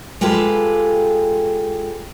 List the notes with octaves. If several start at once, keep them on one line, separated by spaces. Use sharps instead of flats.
G#3 F4 G4 A4 B4